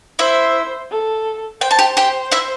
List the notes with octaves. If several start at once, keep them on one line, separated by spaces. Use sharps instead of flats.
E4 C5 E5
A4
C5 G5
A5
G4 G5
G4 G5
E4 E5